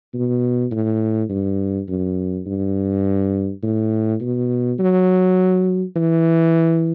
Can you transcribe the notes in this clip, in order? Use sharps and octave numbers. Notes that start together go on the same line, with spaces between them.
B2
A2
G2
F#2
G2
A2
B2
F#3
E3